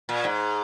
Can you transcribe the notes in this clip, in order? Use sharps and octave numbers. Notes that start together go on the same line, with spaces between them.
A#2
G#2